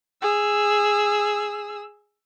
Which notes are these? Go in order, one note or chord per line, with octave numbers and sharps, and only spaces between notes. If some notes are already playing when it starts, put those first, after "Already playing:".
G#4 E6